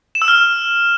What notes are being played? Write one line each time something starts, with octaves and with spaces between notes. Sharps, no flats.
E7
E6
F6